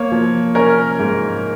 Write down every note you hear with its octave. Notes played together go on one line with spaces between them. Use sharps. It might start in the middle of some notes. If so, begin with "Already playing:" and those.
Already playing: A#3 C#5
F3
C#4 A#4
G#2